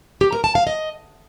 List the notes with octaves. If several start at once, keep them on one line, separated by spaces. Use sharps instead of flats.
G4
A#4
A5
F5
D#5